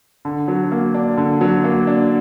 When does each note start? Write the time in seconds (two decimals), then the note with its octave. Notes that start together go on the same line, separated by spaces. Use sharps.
0.25 D3
0.48 F#3
0.72 A#3
0.94 D4
1.17 D3
1.41 F#3
1.64 A#3
1.87 D4